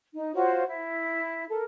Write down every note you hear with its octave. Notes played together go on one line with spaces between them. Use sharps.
D#4
F4 F#4 C5 C#5
E4
A4 A#4